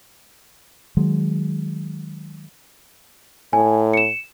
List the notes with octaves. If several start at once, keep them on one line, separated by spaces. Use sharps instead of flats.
D#3 F#3 G#3
A2 G#5
C#7 E7